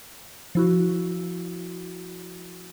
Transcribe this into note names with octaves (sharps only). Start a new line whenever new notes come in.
F3 E4 F#4